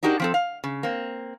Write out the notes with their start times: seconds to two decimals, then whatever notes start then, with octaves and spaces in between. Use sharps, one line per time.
0.03 D4 D#4 F#4 G4 A#4
0.20 F3 C4 A4
0.34 F5
0.64 C#3
0.83 A#3 C4